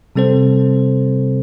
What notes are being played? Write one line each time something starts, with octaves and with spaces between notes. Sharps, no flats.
C3 G3 C4 A4 C5